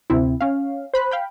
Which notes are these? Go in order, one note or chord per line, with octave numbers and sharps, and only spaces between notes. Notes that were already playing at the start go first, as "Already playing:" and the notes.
D2 C3 C4 E4
C#4 F5
C5 B5 F#6
F5 G5 B5